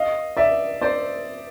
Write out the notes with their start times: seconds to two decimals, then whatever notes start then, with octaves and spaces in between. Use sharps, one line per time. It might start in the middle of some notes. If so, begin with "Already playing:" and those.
Already playing: D#5 F5
0.37 D5 E5
0.81 C5 D5